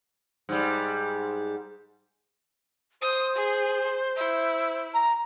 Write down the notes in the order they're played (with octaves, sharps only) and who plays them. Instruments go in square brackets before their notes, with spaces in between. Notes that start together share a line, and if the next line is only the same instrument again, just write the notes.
[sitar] G#2 G3
[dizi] C5 [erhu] D#6
[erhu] G#4
E4
[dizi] A#5